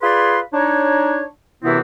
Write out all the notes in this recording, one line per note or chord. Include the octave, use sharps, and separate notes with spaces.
F4 G#4 B4 D5 B5 C6
D4 D#4 C#5
F#2 C3 E3 B3 C4 E4